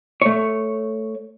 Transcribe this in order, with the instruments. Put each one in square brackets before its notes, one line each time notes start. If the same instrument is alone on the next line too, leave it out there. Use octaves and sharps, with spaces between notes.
[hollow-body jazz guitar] A3 C#5